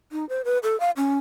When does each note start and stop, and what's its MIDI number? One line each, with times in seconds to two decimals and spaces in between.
0.12 0.27 63
0.29 0.42 72
0.45 0.58 71
0.63 0.78 69
0.80 0.90 77
0.97 1.18 61